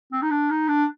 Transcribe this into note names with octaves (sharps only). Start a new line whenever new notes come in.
C4
D#4
D4
D#4
D4